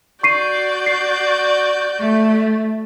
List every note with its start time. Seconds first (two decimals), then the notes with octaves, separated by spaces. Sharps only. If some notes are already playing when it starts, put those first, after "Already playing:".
0.23 F#4 D5 C#6 G6 C7 D#7
0.86 C7
2.00 A3